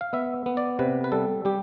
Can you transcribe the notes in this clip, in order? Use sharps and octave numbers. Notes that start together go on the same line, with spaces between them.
F5
B3 E5
B3
D5
C3 B4
B4
G3 A4
G3 G4